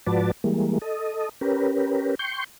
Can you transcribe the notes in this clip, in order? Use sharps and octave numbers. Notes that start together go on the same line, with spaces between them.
G#2 F3 F#4 B4 D5 A5
E3 G3 G#3 A#3
A4 D#5
C#4 G4 A#4 B4
G5 C6 C#6 G6